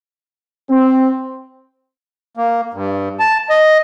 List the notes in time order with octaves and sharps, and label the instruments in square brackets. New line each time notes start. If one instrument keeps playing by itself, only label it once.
[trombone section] C4
[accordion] A#3
G2
A5
D#5